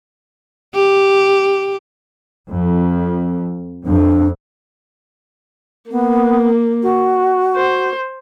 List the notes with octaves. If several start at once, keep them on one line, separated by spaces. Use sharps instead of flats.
G4
F2
F2 D4
A#3 B3
F#4
C5